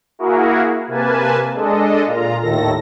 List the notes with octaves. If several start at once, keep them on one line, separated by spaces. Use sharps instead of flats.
A#3 E4 F#4 G#4 A#4
C3 A#3 B4 G#5 A5
G#3 D4 A4 D#5
A#2 F4 A#5
D#2 A2 D#3 A4 A#6